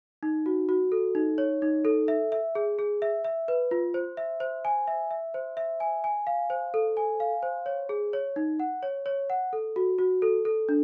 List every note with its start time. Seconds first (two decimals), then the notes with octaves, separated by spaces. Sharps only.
0.23 D#4
0.46 F#4
0.69 F#4
0.92 A4
1.15 D#4
1.38 C#5
1.62 D#4
1.85 A4
2.08 E5
2.32 E5
2.55 G#4
2.79 G#4
3.02 E5
3.24 E5
3.48 B4
3.71 F4
3.94 C5
4.17 E5
4.40 C5
4.65 G#5
4.87 E5
5.11 E5
5.34 C5
5.57 E5
5.80 G#5
6.04 G#5
6.27 F5
6.50 C5
6.74 A4
6.97 G#5
7.20 F5
7.43 C5
7.66 C#5
7.89 G#4
8.13 C#5
8.36 D#4
8.60 F#5
8.83 C#5
9.06 C#5
9.30 F#5
9.53 A4
9.76 F#4
9.98 F#4
10.22 A4
10.45 A4
10.69 D4